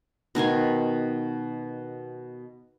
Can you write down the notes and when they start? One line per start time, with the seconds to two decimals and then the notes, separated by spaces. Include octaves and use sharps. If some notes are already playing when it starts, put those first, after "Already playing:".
0.35 B2 D#3 G#5 C6